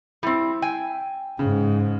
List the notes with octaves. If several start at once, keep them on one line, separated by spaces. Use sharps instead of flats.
G3 C4 E4
G5 G#5
G#2 C#3